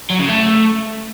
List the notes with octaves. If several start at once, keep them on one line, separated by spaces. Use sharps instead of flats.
F#3
C#3
A3